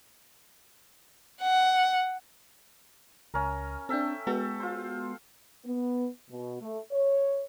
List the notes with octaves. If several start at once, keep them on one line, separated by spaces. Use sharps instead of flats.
F#5
C#2 C#4 A#4
C4 D4 A4 E5 G5
G#3 B3 F#4 A4
F4 C5
B3
B2
A3
C#5